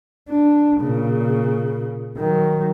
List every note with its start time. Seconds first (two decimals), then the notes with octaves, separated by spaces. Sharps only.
0.30 D4
0.81 A#2 C#3
2.17 D#3 F#3